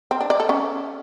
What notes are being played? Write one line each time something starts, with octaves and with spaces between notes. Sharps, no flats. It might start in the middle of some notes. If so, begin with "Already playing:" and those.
C4
D4
D5
A4
C#4